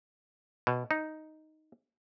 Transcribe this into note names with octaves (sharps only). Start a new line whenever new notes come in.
B2
D#4